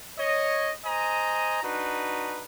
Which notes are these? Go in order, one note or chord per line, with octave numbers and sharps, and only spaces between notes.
C#5 D#5
C5 D#5 G#5 A#5
D4 D#4 F#4 B4